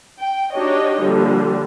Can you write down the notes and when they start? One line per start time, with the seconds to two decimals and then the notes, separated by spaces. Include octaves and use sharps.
0.19 G5
0.54 D4 D#4 F#4 G4 C#5 D#5
1.00 A#2 D3 F3 G3